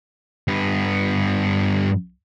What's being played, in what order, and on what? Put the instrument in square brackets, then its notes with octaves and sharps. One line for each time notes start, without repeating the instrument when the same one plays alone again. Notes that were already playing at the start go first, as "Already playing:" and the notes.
[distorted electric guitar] G2 B3